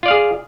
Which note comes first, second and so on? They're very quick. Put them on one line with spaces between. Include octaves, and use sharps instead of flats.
F4 D5 F5 G#4